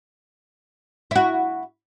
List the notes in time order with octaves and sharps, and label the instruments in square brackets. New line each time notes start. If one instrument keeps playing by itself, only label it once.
[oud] E4 F#4